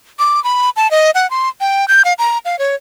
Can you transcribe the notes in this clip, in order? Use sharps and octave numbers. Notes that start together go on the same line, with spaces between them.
D6
B5
A5
D#5
F#5
C6
G5
G6
F5
A#5
F5
C#5